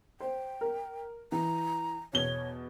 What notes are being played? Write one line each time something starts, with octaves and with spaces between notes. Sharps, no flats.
C5 G5
A#4
E3 A#5
E2 B2 C#5 G7